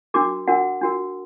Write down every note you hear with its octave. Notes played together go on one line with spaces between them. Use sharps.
D4 F#4 A#4 D6
D4 F#4 A#4 F#5
D4 F#4 A#4